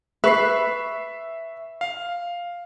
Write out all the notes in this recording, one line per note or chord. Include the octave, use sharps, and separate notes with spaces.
B4 E5 C#6 C7
F5